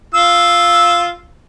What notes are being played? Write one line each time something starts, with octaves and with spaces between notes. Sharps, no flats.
F4 E6